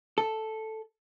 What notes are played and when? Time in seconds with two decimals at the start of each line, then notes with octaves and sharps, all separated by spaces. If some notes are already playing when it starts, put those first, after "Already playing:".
0.18 A4